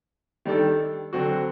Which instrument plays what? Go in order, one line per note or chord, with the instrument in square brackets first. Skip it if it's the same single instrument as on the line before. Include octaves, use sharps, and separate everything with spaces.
[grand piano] D#3 G3 D4 A4
D3 F#3 C4 F#4